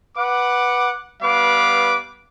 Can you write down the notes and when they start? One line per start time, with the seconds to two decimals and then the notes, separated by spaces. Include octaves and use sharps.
0.16 B4 F#5 D6
1.21 G3 B3 B4 F5 D6